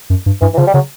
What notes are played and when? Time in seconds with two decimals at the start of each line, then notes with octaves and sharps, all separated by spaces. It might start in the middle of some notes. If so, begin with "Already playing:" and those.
0.10 F#2
0.26 G2
0.42 G2 E3
0.54 E3
0.58 C#3 F3
0.67 G3
0.74 C#3 F#3